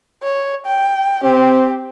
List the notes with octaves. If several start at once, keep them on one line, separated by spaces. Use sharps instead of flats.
C#5
G5
C4 G4